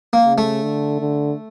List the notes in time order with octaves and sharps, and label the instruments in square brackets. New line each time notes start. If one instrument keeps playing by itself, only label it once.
[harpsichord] A#3
[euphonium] C#3
[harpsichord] A3
[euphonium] D3
D3